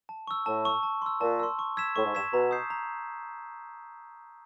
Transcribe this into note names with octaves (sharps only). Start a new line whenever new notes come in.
A5
C#6 E6
A2 A5
C#6 E6
A5
C6 E6
A#2 A5
C6 E6
C#6
E6 G#6 B6 E7
A2 C#6
G#2
G2 E6 G#6 B6 E7
B2 A#5
D#6 G6 C7
A#5